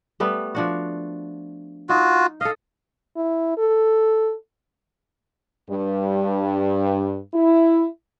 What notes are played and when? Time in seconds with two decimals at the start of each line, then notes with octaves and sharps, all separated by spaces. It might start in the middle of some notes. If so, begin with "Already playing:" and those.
0.20 G3 A3 B3
0.55 F3 D4 F#4
1.89 D#4 F4 F#4
2.41 A4 D#5 F5
3.16 E4
3.57 A4
5.69 G2
7.33 E4